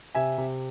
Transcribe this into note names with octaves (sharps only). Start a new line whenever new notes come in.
C3 E5 G#5
C3